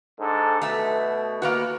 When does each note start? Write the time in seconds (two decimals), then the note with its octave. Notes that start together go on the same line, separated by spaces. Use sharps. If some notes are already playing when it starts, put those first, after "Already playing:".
0.19 G#2 D4 A4
0.62 B2 A3 E5
1.42 A#3 B3 F#4